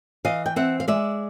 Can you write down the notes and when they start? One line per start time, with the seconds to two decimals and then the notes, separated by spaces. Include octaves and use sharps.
0.25 E3 D#5 F5
0.46 G5
0.56 C4 E5 F#5
0.80 F5
0.88 G#3 D5 E5